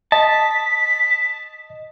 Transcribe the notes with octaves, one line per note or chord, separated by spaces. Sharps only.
D#5 A5 B6